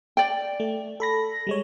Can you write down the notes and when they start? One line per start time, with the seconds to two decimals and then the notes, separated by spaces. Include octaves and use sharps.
0.17 D5 G5
0.60 A3
1.00 A4 B5 A#6
1.47 G3 G#3 C#5